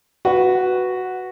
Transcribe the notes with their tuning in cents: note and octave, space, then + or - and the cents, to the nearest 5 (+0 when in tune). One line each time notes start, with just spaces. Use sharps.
F#4 +0 B4 +0